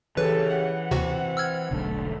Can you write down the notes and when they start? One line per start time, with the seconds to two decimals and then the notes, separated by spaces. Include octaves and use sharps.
0.17 C#3 E3 G4 A4 B4
0.56 F#5
0.91 D#2 C3 C4 F#4
1.37 E6 F6 G#6
1.71 E1 B1 D3 A3